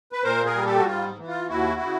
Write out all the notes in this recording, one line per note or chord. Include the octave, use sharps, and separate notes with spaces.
B4
A#2 A#4 C5
G#4 A#4
G3
G4 A4
F#4
G#2 F4
E3
F4
D#2 E4 F#4
C#3